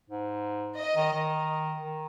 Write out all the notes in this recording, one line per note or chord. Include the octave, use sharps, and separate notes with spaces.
G#2
D#5
D#3
D#3
D#3